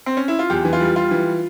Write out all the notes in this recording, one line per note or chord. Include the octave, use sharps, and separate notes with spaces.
C4
C#4
E4
F4
E2 G4
E3
F4
G3
G3 F4
E3